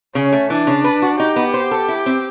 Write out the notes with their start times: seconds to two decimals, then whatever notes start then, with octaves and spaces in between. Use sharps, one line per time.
0.15 C#3 C#4
0.33 A3
0.50 E3 D4
0.67 C#3
0.84 B4
1.02 F#4
1.20 D#4 G4
1.36 B3
1.54 C5
1.71 A4
1.89 E4
2.06 C4